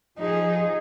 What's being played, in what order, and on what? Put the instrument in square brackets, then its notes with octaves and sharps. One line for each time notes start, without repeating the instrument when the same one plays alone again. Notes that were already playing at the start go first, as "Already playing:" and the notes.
[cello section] F3 G#4 [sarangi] D#4